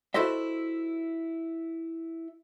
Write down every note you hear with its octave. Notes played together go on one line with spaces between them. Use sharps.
E4 F#4 A4 C5 D#5 E5